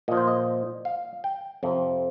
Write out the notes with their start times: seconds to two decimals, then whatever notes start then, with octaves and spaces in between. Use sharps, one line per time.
0.08 A#2 F3 D#5
0.17 C5
0.27 D#5
0.85 F5
1.24 G5
1.63 F2 C3 F3